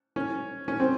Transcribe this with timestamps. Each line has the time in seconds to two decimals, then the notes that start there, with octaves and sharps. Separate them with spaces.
0.16 C#4
0.68 C#4
0.80 C4